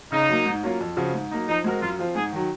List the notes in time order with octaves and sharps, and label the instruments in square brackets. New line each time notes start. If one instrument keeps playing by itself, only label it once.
[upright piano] C#3 [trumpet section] D#4
[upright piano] F#3 A#3
G#2
F#3 A#3 C#4 F4
F2
C#3 F3 C4 F#4
G#2
F#3 A#3 D#4
[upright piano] F3 [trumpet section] D#4
[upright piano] G#3 C4 F#4 A#4
[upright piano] F#2 [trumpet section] F4
[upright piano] F3 C4 F4
[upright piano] G#2 [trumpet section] G#4
[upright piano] D#3 F#3